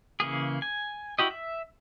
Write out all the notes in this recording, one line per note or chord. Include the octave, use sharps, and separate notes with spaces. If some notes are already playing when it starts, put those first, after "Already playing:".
C#3 E3 A#3 G#4
G#5
E4 F#4 G4 D#5
E5